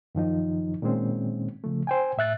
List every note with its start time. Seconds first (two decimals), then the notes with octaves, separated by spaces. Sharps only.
0.15 F#2 D#3 F3 D#4
0.82 A#2 D#3 G#3 C4 C#4
1.64 C#3 F3 A3
1.87 C5 G5 G#5
2.18 A2 E5 F#6 A6